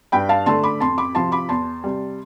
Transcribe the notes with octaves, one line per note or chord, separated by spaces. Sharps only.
G2 G5 B5
F5 A5
D3 A3 A5 C6
B5 D6
F2 A5 C6
B5 D6
C3 F3 A5 C6
B5 D6
E2 A5 C6
C3 G3